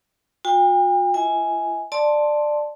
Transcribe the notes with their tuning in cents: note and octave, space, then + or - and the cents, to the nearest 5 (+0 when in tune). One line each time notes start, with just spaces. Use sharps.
F#4 -45 G5 +45
F4 -45 E5 -40 G#5 +0
D5 +15 A5 +0 C6 +5